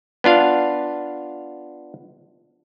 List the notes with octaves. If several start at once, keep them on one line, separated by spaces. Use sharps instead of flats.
B3 D4 F4 F5